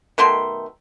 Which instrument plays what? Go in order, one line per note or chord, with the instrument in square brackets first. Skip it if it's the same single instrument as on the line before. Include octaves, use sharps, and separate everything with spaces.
[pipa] B2 D#3 A3 C6